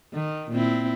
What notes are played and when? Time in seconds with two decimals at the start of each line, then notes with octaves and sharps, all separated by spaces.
0.14 D#3
0.51 A#2 C4 E4